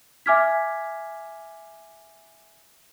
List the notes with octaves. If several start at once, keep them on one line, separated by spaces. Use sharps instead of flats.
E5 G#5 D6 F6 G#6 B6